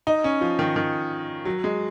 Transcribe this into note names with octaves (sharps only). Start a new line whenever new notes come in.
D#4
C#4
F3
D#3
D#3
F#3
G#3